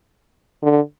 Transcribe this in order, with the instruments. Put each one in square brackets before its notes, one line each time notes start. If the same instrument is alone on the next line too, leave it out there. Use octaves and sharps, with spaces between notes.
[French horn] D3